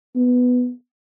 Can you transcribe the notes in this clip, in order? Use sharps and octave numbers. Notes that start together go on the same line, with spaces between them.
B3